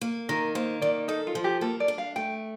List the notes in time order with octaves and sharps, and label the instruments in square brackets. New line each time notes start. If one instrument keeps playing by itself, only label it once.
[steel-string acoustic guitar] A#3
[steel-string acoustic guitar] D#3 [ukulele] A#4
[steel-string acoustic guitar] A#3 [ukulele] C5
[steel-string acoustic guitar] D#3 [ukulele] D5
[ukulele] D#4 [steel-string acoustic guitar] A4
[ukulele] F4
[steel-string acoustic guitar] F3
[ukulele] G4
[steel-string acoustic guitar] A#3 [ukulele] A4
[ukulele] D5
[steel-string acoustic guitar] D4
[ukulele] F5
[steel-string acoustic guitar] A3 [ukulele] G5